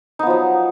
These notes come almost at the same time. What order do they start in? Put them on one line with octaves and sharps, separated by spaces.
D#4 B3 F3 F#3